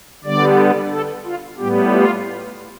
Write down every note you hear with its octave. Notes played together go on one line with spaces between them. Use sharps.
D3 G3 B3 D5
A4
F4
A2 G3 B3 G4
F4